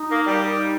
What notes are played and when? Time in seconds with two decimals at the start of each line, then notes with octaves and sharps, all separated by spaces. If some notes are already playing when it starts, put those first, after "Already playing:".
Already playing: D#4
0.09 A#3
0.26 G3
0.42 D#4